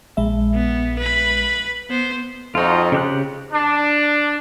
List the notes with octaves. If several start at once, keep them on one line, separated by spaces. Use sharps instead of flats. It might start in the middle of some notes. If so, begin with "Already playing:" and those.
A#1 G#3 E5
B3
B4 B5
B3 C5
F2 D#4 F4 F#4 A4 C5
C#3 G4 F#6
D4